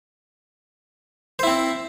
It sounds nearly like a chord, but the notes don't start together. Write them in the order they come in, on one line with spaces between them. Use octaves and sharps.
C5 E4 C4